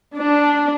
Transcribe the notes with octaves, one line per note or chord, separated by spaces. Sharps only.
D4